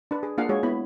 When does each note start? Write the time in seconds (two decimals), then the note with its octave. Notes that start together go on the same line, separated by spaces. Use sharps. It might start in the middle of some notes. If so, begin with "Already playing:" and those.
0.11 D4 B4
0.23 G#4
0.38 A#3 D4 F4 G#4 F5 F#5
0.49 G#3 F#4 G#4 C#5
0.63 B3 E4 B5